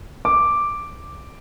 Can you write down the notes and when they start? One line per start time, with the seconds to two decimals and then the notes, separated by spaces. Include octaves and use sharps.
0.25 D6